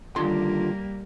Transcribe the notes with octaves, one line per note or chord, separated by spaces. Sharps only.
D#2 D3 G3 A#3 F4 C6